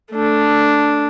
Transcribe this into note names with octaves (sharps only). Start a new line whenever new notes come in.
A3 D4